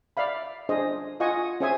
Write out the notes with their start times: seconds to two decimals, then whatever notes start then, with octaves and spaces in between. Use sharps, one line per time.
0.17 D5 E5 F5 B5
0.69 D4 G#4 C5 D#5
1.20 F4 D#5 F#5 G#5 C#6 D#6
1.60 C#4 G#4 C5 E5 G#5 D#6